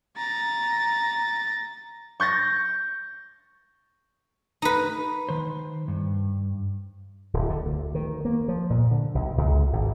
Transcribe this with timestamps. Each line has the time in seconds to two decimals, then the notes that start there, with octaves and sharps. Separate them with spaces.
0.17 A#5 A6
2.20 C#6 G6 A6 A#6
4.62 D#4 B4
5.29 D#3 C5
5.88 G2
7.34 D1
7.50 D3
7.66 D2
7.95 D#3
8.25 A#3
8.48 F3
8.70 A#2
8.91 D3
9.15 B1
9.38 C#2
9.73 G#1